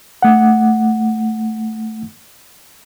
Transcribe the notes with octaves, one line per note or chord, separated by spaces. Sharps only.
A3 F#5